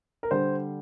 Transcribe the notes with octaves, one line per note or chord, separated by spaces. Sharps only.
A#4
D3 G3 C5